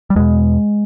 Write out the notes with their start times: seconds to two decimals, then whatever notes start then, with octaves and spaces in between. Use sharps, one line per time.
0.10 G3
0.16 E2 B2 G#3